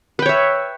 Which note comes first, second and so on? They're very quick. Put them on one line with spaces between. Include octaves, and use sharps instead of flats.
B4 G5 C#5 E5